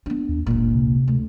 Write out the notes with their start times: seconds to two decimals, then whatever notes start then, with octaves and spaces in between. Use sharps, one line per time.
0.06 B3 D4
0.29 D#2
0.46 F#1 C#2 A#2
0.75 C3
1.08 D2